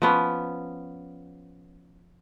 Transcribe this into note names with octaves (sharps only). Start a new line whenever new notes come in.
F3 B3 C#4